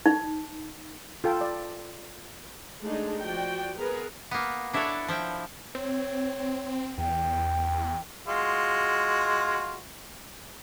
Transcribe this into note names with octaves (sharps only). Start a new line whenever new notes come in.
D#4
F4 A4 G5
D5
G#3 A3 D4 D#4 G#4
F3 F#4 D5 G5
B3 G#4 A#4 B4
A#3 B3
D4 E4 F#4 A4 C#5 D5
F3 E4 G5
C4 C#5
E2 G5
G#3 F4 F#4